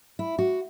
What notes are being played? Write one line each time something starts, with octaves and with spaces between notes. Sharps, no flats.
E4
F#4